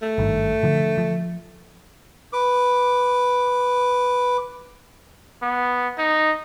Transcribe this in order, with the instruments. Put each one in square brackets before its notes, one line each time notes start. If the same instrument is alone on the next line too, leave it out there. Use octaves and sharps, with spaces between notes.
[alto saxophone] A3
[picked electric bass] G#1 G2 D#3
D3 F3
F3
[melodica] B4 D6
[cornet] B3
D#4